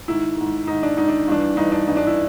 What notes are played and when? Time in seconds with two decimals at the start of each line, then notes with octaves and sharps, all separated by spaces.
0.08 G#2 D#3 E4
0.37 G#2 D#3
0.67 G#2 D#3 D#4
0.83 D4
0.97 G#2 D#3 D#4
1.09 D4
1.28 G2 E3 D4
1.57 G2 E3 D#4
1.72 D4
1.87 G2 E3 D#4
1.97 D4
2.07 E4